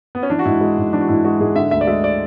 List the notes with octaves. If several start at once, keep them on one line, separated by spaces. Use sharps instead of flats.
B3
C#4
E3 D4
F#4
G#2 E4
G#3
G#2
E3 D4
F#4
G#2 E4
G#3 F#4
G#2 G#4
D3 E5
D2 E5
D5
G#3 E5
D5